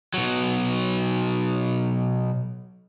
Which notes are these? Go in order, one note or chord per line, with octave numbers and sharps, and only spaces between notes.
B2 F#3